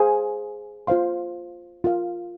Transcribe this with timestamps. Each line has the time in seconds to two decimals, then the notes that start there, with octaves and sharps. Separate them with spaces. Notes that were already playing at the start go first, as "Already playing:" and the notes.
Already playing: G#4 C5 F5 G#5
0.87 F4 C5 F5 C6
1.84 F4 A#4 F5